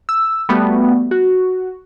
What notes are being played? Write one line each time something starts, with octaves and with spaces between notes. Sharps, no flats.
E6
G3 A3 B3 F#4
F#4